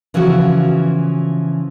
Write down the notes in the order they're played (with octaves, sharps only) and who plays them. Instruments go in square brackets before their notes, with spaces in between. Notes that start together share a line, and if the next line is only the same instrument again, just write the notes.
[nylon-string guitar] C#3 E3 F3 B3 F#4